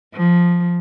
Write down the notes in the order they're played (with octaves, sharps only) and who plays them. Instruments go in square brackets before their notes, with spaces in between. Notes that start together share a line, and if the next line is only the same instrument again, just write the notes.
[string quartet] F3